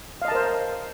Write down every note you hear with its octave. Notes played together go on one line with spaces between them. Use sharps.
A#4 C5 D#5 F5 A5